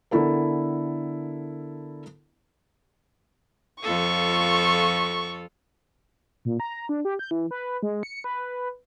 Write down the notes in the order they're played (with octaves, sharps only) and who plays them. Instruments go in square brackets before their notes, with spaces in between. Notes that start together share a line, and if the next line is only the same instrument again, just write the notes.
[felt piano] D3 B3 E4 A4 A#4
[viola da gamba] F2 F4 A4 [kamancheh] C#6
[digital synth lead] A#2
A#5
D4
G4
G6
E3
B4
G#3
C#7
B4